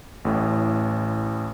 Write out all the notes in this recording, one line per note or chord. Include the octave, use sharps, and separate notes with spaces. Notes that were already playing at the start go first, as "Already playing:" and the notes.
A1 A2